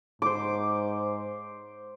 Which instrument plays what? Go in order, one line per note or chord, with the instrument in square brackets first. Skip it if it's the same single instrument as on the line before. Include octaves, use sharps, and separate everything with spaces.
[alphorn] G#2 [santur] C5 D6